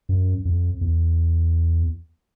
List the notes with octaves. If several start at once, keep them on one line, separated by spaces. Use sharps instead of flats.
F#2
F2
E2